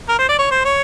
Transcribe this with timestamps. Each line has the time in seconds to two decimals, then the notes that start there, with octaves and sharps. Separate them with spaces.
0.09 A#4
0.19 C5
0.29 D5
0.38 C#5
0.51 C5
0.65 C#5